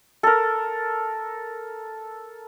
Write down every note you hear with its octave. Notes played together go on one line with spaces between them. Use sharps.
A4 A#4